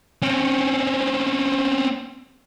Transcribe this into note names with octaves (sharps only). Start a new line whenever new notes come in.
C4 C#4